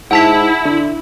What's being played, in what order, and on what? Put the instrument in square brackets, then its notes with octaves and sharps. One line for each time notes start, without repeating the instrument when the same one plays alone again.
[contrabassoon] G#2 [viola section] E4 [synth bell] F#5 A5 B6
[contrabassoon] D3